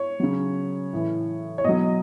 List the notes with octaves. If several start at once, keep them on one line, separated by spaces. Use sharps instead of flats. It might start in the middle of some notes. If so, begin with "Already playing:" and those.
Already playing: C#5
C#3 F#3
A2 E3
C#5
B2 F#3 D#5